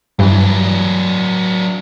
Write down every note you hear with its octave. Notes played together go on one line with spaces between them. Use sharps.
G2 E3 F#3 D4